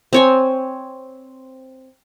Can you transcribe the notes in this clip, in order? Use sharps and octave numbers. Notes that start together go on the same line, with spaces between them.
C4 C#5 G#5